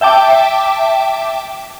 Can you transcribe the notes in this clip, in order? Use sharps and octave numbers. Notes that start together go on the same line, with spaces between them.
E5 G5 A5 D6